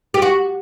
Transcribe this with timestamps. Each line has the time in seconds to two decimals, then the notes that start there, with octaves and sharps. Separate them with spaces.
0.14 G4
0.22 F#4